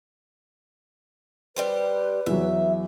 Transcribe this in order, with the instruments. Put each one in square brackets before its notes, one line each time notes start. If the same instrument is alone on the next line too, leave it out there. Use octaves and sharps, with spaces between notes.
[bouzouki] G3 G4 C5 [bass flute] B4
[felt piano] E2 F#3 [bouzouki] E5